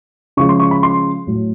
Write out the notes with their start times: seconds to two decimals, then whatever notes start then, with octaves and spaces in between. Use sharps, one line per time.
0.37 C#3 F3 G#3 C#6
0.49 C6
0.60 C#6
0.71 B5
0.83 C6
1.27 A2 F#3